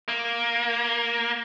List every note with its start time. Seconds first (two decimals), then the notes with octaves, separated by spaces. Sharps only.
0.08 A#3